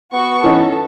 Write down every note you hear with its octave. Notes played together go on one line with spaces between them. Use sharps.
B3 F#4 C#6
E3 C#4 D#4 A4